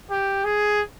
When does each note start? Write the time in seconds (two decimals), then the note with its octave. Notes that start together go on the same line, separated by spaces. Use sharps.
0.11 G4
0.45 G#4